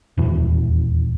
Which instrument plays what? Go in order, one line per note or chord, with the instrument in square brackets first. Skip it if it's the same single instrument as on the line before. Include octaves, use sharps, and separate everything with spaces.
[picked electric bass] D#1 E2